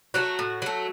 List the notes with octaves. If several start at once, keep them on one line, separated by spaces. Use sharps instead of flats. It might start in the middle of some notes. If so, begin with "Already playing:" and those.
F#3 A3 F#4
A2
F#3 A3